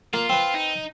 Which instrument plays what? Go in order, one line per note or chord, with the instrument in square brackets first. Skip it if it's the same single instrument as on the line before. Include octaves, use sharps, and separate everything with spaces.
[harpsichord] A#3 [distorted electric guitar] F4
[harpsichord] C4 B4
[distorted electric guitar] D#4